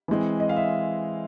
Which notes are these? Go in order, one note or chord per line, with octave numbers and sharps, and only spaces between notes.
E3 G#3 C4
D#5
F5
E5